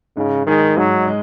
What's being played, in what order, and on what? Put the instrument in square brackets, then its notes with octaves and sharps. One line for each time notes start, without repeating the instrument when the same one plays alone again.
[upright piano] G#2 [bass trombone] C#3
[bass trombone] D#3 [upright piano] G#3 D#4 G#4
[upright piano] G#2 [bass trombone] F#3
[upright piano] G#3